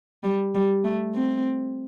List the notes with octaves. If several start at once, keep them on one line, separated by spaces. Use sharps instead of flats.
G3
G3
A3
C4